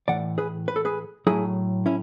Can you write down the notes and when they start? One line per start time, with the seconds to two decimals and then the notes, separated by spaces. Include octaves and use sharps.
0.08 A2 E3 D5 F#5
0.38 G#4 B4
0.68 B4
0.76 A4
0.85 G#4 B4
1.27 A2 F#3 E4 G#4
1.86 C#4 E4